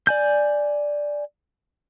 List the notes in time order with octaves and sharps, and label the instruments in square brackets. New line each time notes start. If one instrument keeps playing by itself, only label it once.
[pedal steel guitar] D5 G#5 G6